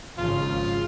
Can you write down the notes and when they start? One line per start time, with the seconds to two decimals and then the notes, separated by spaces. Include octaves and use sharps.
0.18 G#1 C#3 F3 F4